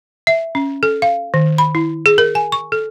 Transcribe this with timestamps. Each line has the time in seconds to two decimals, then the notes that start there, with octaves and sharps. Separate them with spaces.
0.27 E5
0.55 C#4
0.83 A4
1.02 F5
1.34 D#3
1.58 B5
1.75 E4
2.06 G#4
2.18 A#4
2.35 G#5
2.52 C#6
2.72 A4